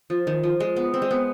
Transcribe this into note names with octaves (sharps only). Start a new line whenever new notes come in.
F3
D#3
F3
G#3
B3
C4
G#3
B3